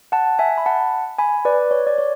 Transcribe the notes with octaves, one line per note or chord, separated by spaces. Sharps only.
F#5 A5
E5 G#5
B5
F#5 A5
G#5 B5
B4 D5
C#5
D5
C#5